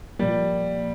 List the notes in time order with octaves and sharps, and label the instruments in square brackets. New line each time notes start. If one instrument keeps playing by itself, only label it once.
[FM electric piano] A#2 F3 A#3 [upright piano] G3